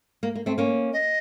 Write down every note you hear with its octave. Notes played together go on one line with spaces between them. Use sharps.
A#3
A#3
A3 C4
A#3 C#4
D#5